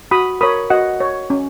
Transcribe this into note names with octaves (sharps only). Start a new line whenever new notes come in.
F#4 B5 D#6
A#4 C#5 B5 D#6
F#4 D#5 F#5
C#5
C#4